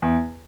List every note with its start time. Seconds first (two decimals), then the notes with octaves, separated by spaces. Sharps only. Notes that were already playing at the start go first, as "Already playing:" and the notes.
0.02 E2